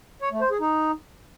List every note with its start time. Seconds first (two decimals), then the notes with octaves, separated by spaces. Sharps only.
0.22 C#5
0.31 A3
0.41 C5
0.51 G#4
0.60 D#4